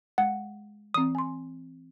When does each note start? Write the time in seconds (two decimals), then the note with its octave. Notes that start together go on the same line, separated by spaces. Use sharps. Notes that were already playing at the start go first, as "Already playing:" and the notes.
0.18 G#3 F#5
0.94 E3 C4 D#6
1.15 G#5 C6